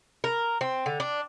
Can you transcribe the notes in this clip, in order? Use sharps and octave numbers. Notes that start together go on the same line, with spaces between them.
A#4
C4
D3
D4